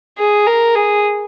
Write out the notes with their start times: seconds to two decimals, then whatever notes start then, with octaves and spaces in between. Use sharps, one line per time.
0.18 G#4
0.47 A#4
0.75 G#4